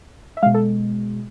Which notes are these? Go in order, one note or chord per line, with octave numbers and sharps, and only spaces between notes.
E5
B2 G#3 F5
A4